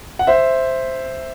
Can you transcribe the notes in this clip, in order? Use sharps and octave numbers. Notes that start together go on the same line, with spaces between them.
F#5
C5 E5